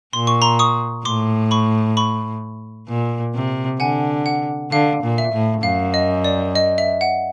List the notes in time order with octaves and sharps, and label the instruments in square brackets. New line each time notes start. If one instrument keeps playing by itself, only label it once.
[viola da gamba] A#2 [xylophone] C6
[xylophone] C#6
A#5 C6
C#6 D#6
[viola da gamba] A2 [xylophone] C6 D6
[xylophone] B5 C#6
B5 C#6
[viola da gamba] A#2
C3
[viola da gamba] D3 [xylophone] F#5 G#5
[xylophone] F#5
[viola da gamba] D3 [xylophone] F5
[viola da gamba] A#2
[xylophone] E5
[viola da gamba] A2
[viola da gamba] F#2 [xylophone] F5
[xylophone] D#5
D5
D#5
E5
F#5